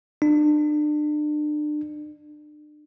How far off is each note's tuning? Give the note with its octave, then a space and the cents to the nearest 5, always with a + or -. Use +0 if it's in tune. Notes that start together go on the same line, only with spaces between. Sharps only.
D4 +35